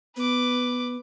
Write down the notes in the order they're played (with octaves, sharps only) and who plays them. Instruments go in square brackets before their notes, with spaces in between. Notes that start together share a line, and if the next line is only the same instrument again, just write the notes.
[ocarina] B3 [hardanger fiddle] B4 D6